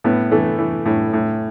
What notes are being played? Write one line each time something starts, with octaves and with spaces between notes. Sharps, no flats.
A2 B3
E3 A3
E3
A2
A2